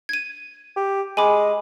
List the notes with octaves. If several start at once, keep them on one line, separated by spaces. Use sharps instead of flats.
G#6 D#7
G4
G#3 G#5 B5 D6